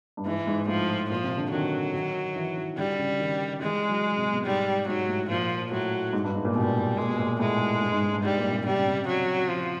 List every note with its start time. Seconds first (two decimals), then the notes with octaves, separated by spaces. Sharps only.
0.17 G2
0.26 G#2 E3
0.47 G#2
0.68 A2 F3
1.10 A#2 F3
1.24 C3
1.38 D3
1.52 D#3 F#3
1.94 D#3
2.36 E3
2.57 D#3
2.78 D3 G3
2.99 C#3
3.20 D#3
3.62 E3 G#3
3.89 F#3
4.18 C3
4.32 B2
4.46 G#2 G3
4.88 G#2 F#3
5.09 A2
5.30 A#2 F3
5.72 A2 F#3
6.13 G#2
6.24 G2
6.35 G#2
6.45 A#2
6.56 B2 G3
6.97 A#2 G#3
7.08 B2
7.19 A#2
7.40 A2 G#3
7.81 G2
7.92 G#2
8.03 G#2
8.13 G2
8.24 G#2 G3
8.38 A#2
8.51 C3
8.66 C3 G3
8.76 C#3
8.86 C3
9.08 F#3
9.49 F3